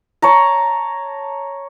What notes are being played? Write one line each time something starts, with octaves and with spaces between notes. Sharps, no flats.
C#5 A5 A#5